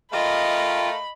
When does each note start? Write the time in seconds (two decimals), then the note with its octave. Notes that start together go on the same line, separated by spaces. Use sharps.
0.13 A3 F4 A#4 D#5 F5 G5 B5